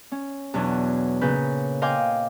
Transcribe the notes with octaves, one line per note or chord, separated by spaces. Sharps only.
C#4
E2 B2 F#3 D4
A#2 C#3 B4 G6
D#5 F5 G5 G#5 C6 D6